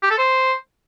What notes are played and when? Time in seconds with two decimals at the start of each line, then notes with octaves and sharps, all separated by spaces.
0.03 G4
0.10 A4
0.18 C5